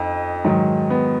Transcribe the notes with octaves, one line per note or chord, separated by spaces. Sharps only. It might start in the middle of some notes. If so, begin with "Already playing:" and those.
Already playing: F2 D#4
G#2 D#3 F#3
B3